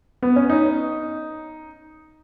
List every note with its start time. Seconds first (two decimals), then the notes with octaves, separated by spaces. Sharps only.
0.22 B3
0.36 C#4
0.50 D#4